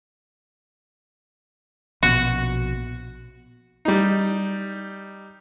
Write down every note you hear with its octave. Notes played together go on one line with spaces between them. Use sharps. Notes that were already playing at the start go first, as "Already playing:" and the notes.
A#1 B2 F#4
G3 D#4